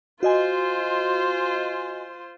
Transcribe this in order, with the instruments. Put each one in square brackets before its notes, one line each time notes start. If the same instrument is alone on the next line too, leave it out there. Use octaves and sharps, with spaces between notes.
[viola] F4 C5 [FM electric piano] F#4 D#5 G#5